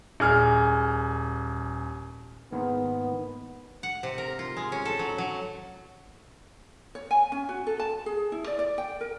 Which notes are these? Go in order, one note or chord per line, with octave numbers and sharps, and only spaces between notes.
D#1 G#4 F6
G#2 D#3 A#3 B3
F#5
C3
A#4
F4
G#3
C#4
A4
F#3
F#3
C#5
G#5
C#4
F#4
A4
A5
G#4
E4
D5
D5
G5
A#4